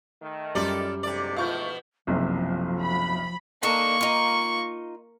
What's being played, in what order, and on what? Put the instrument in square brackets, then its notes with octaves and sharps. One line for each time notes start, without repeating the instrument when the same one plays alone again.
[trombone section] D#3 A3
[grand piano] F#2 G3 [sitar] F4 A4 D5
[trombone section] E2 G#2 A3 [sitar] C3 D5
[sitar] B2 F3 [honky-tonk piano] F4 C#6 G6
[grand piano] F#1 B1 C3 [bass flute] F3
[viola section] B5
[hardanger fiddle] A#3 C#6 [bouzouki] D4 D#4 A4
[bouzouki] D#4 F4